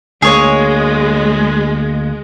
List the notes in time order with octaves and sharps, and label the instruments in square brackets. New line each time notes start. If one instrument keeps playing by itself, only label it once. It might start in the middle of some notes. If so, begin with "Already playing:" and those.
[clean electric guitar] D2 A#3 [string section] G#3 [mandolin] G#4 C#5